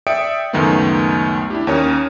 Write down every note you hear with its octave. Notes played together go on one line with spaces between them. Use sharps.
D5 E5 G5 D#6 C#7 D7
C#2 F#2 D#3 F#3 A3 B3
D4 E4 G4
D#2 C#4 A#4 C#5 D#6